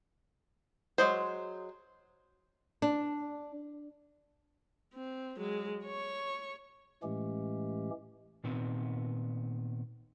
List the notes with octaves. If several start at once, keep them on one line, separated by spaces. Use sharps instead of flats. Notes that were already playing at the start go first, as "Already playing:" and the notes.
F#3 G#3 C5
D4
C4
F#3 G#3
C#5 C#6
A2 E3 G#3 A3 C#4 G4
A#2 D#3 B3 C4